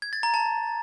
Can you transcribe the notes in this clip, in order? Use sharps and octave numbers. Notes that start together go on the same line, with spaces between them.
G#6
A6
A#5
A5